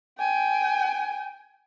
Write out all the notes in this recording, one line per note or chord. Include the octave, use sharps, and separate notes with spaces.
G5 G#5